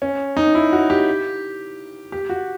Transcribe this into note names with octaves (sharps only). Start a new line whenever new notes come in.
C#4
D#4
E4
F#4
G4
G4
F#4